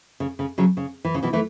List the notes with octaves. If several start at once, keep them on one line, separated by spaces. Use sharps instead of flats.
C#3
C#3
C#3 F#3
C#3
E3
C#3
B2 E3
E3 A3